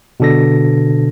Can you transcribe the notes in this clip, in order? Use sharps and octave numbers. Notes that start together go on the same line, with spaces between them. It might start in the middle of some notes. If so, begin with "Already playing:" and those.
B2 D3 D4 A4 A#6